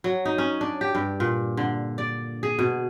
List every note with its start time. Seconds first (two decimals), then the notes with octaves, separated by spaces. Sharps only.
0.04 F#3
0.25 D#4
0.38 C#4
0.61 D4
0.81 G4
0.95 G2
1.20 A#2
1.57 D3
1.98 D5
2.43 G#4
2.59 B2